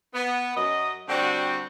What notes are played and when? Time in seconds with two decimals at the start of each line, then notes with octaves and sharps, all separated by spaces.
0.15 B3
0.57 F#2 D#5
1.08 D3 G3 A3 C4 F#4